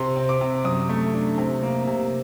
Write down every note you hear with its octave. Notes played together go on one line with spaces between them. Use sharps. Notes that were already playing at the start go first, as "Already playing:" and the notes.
Already playing: C3 C6
C4
D6
C3
F#2 D#6
A3
D4
C3
A#3
C3